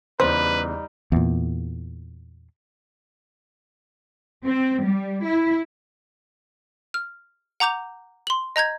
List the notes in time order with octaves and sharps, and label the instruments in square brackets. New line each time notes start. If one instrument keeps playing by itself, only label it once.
[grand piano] E2 C#3 [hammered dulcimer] G3 D#4 [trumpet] B4 [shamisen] C5
[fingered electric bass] E2 A#2
[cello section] C4
G3
E4
[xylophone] F6
F#5 A#5 D6 G6 F7
C6 F#7
D#5 A#5 G6 G#6